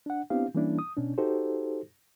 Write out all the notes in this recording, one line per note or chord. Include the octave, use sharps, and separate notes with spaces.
D4 F#5
B3 C4 D4 E4 G4 F5
E3 G3 A#3 C#4 D4 E4
D#6
B2 C#4 D4
D#4 F#4 G4 A4 C5